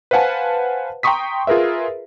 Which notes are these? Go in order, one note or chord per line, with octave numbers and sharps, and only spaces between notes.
B4 C5 F5 F#5 G#5 A5
G5 A#5 C6 C#6 D#6 B6
F4 G#4 A#4 B4 E5